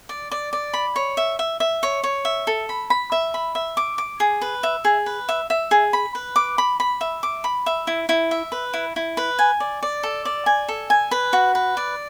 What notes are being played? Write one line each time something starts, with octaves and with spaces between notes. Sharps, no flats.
D5
D5
D5
B5
C#5
E5
E5
E5
C#5
C#5
E5
A4
B5
B5
E5
B5
E5
D6
D6
G#4
B4
E5
G#4
B4
E5
E5
G#4
B5
B4
D6
B5
B5
E5
D6
B5
E5
E4
E4
E5
B4
E4
E4
B4
G#5
D5
D5
A4
D5
G#5
A4
G#5
B4
F#4
B4
D5